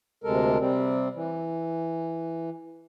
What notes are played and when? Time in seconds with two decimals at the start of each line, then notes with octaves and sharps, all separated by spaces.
0.24 D2 C3 G#3 A4 A#4
0.58 C3 G3 C4
1.15 E3